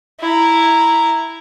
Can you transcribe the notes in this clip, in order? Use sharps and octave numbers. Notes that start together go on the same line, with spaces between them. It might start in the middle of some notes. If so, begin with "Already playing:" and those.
E4 A#5